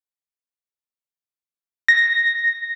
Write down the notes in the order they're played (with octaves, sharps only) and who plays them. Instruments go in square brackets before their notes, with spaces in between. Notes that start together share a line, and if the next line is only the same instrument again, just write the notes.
[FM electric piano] A#6